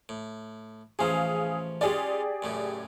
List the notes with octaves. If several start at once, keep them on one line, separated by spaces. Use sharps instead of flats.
A2
A1 F3 C#4 G#4 F5 D#6
G#3 C#4 F4 G4 G#4 D5
F#2 A2 C#3